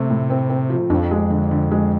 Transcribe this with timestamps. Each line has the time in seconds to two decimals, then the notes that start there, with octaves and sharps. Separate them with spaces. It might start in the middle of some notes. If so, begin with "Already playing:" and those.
Already playing: C3 A3 C4
0.10 A2
0.30 C4
0.50 C4
0.70 F3
0.90 F2 D4
1.11 G#3
1.30 D3
1.51 D3
1.71 G#3